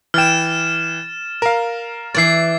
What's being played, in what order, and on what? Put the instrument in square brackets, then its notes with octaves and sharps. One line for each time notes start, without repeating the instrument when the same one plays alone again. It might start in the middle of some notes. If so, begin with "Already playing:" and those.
[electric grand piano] E3 G5 [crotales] F6 A6 E7
[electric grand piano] A#4 F5
[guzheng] E3 D5 [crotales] A6 C7